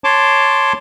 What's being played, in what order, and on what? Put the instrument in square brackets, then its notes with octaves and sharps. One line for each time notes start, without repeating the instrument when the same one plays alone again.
[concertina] C#5 A5 C6 D6